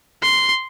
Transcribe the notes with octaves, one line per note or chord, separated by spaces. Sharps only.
C6